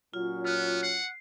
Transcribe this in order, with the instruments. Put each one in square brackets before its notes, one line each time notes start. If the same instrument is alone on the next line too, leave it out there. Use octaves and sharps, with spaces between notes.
[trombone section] A#2 F#3 C#4 [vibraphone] F4
[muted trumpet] B3 [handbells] F6 F#6
[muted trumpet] F#5 [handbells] C7